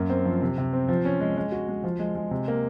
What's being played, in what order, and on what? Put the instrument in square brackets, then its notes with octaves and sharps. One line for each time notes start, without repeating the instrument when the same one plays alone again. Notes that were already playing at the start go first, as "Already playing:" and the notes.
Already playing: [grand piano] F#2 A#3
C4
F3
C3
C3
C4
F3
C#4
G#3
G#3
F#4
G#3
F3
G#3
G#3
C3
A#3